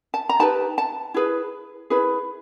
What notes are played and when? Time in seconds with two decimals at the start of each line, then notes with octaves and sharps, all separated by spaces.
0.14 A5
0.29 A#5
0.39 D#4 G4 B4 A5
0.78 A5
1.14 E4 G#4 B4
1.90 E4 G#4 B4